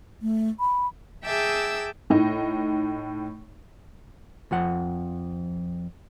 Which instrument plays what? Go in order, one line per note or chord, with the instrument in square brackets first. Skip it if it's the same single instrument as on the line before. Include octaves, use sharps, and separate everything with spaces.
[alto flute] A3
B5
[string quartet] G#4 E5 G5 A5 D6 E6
[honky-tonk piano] A2 D#4
[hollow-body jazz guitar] F2 F3 F#5